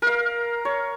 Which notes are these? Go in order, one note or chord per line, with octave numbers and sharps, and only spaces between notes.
A#4 F5
C#5